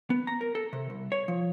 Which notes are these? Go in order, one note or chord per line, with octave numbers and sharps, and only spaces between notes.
B3
A#5
A#4
A4
C3
C2
C#5
F3